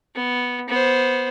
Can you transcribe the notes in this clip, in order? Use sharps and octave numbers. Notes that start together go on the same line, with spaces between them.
B3
B3 C5